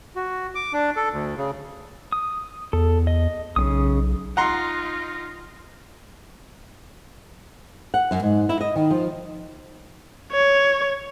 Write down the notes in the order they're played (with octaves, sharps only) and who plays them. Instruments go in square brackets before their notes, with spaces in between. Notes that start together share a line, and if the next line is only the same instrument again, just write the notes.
[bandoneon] F#4
D6
D4
A4
D2
C#3
[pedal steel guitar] D#6
[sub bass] E2 [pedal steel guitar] A4
[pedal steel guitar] D#5
[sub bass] B1 [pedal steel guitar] C#3 C#4 D#6
[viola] D#4 F4 [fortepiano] F#5 A#5 C6
[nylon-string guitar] F#5
F#2
G#2
E4
D#5
D#3
F3
[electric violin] C#5